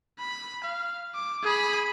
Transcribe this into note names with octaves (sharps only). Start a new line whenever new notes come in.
B5
F5
D6
G#4 B5